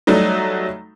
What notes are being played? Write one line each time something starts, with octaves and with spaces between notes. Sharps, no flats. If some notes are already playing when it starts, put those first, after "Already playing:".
F#3 G3 A3 D#4